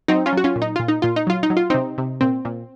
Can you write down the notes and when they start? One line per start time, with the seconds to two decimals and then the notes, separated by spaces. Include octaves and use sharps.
0.08 F#3 C4 D#4
0.26 C#4 F4
0.33 F#3 F#4
0.44 C#4 F4
0.56 A#2
0.62 D#4
0.76 A#2 F4
0.88 D#4
1.02 A#2 F4
1.16 D#4
1.27 F#3 F4
1.43 D#4
1.50 F#3
1.57 F4
1.70 C3 C4 D#4
1.98 C3
2.21 A#2 C4
2.45 A#2